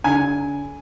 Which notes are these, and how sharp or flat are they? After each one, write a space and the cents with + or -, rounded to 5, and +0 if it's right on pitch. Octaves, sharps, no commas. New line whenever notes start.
D3 -40 G#5 +0